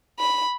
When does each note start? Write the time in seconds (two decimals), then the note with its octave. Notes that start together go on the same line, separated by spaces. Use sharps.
0.19 B5